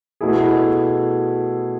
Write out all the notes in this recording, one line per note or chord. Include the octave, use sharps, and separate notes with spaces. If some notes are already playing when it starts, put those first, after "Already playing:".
B2 A3 E4 G#4